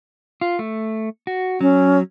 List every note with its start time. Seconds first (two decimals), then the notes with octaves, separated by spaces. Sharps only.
0.41 F4
0.59 A3
1.27 F#4
1.61 F#3 C#4